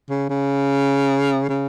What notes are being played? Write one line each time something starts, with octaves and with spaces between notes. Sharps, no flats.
C#3
C#3
C#3